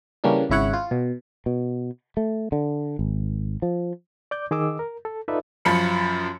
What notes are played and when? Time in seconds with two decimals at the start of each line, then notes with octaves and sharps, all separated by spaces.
0.24 C#3 E3 G3 A#3 C#4 D4
0.50 G#1 C#3 E4 C#5 F#5
0.73 F4
0.91 B2
1.46 B2
2.17 A3
2.52 D3
2.99 G#1
3.62 F3
4.31 D5 D6 G6
4.51 D#3 G#4 D#5 D6 E6
4.79 A#4
5.05 A4
5.28 D#4 F4 A4 B4 D5 E5
5.65 F#2 F3 B5 C#7